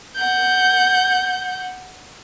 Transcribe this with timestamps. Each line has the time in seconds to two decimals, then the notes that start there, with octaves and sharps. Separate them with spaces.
0.16 F#5 G6